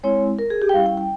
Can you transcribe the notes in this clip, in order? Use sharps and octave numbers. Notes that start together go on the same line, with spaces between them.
G#3 C4 E4 C#5
A#4
G#4
G4
G5
G3 C#4 E4 F5
G5
G5